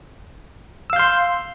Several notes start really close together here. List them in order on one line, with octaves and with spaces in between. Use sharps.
E6 F5 G6 C6